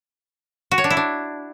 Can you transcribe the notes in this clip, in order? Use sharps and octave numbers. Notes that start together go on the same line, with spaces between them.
F#4
C#5
D4
E4
D4